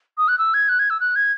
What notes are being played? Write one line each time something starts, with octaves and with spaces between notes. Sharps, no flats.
D#6
F#6
E6
G#6
F#6
G#6
E6
F#6
G#6